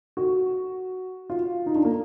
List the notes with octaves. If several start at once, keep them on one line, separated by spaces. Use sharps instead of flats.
F#4
F4
D#4
D4
A#3